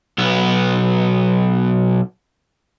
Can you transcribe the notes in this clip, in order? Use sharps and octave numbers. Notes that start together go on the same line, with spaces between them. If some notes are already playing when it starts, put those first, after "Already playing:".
B1 B3